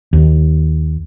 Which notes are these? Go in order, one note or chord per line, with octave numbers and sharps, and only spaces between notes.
D#2